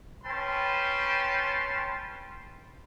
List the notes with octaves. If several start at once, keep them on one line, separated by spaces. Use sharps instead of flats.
C#4 B4 G5 A5 C6